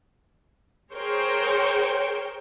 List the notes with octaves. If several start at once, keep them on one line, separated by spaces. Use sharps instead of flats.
G#4 A#4 C5 C#5 G5